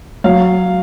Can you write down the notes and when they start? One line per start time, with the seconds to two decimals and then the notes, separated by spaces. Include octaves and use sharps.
0.24 F#3 F5